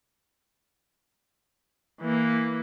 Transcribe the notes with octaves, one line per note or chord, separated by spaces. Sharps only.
E3 A#3